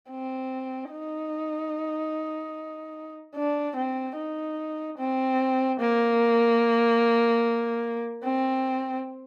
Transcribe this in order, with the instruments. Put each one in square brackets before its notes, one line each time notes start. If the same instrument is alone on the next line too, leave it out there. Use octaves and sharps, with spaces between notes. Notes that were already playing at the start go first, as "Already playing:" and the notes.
[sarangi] C4
D#4
D4
C4
D#4
C4
A#3
C4